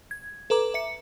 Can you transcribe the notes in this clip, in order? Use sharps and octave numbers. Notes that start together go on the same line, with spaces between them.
G#6
A4 B4 A#5 D6
E5 C#7